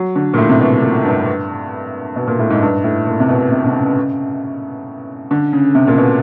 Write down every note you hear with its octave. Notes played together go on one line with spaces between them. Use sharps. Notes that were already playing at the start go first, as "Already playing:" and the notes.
Already playing: F#3
D3
A#2
A2
C3
B2
A#2
G2
B2
A#2
A2
G#2
G2
A2
A#2
C3
B2
C3
C3
C#3
D3
C#3
C3
A#2
B2